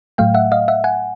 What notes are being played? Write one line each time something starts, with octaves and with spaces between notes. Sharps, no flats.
A2 F#3 A3 F5 G5
E5 F#5
D#5 F5
E5 F#5
F#5 G#5